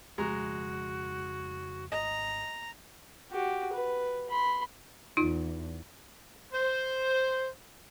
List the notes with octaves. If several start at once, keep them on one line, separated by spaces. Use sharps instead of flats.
F2 C#3 F3 G#3 F#4 A#5
G#1 D#5 A#5
F#4 G4
B4
B5 C6
E2 D#4 F4
C5